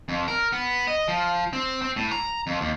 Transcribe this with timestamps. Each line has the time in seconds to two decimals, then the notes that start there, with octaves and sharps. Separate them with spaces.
0.09 F2
0.28 A#4
0.52 B3
0.87 D#5
1.08 F3
1.53 C4
1.82 C4
1.96 A2
2.11 A#5
2.47 F2
2.61 D#2